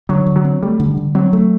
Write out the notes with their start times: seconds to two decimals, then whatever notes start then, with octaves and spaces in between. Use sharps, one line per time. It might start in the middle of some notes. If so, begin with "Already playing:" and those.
0.09 D3 F#3
0.27 D3
0.36 F#3
0.45 C4
0.63 G3 A3
0.80 D3
0.97 D3
1.15 F#3 C4
1.33 A3